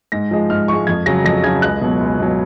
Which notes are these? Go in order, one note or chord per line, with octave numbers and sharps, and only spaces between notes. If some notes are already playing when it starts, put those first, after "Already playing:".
G#2 A#6
F3 G#3
G#2 F6
F3 G#3 C#6
F2 G#6
C#3 F#3 A#6
F2 A#6
C#3 F#3 G#6
C#2 F#6
B2 F#3
C#2
B2 F#3